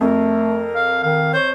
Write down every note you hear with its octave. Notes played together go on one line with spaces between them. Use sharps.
F2 A3 A#4
F5
D#3 F5
C5 C#5